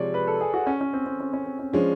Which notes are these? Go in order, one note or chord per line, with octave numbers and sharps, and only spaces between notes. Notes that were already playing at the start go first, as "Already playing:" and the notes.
Already playing: C3 F3 G#3 C#5 D5
B4
A4
G#4
F#4
C#4
C#4
C4
C4
C#4
C#4
C4
C#4
F3 G#3 C#4 D4